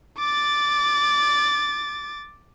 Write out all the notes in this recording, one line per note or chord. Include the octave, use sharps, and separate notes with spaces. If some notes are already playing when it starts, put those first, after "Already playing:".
D6 A6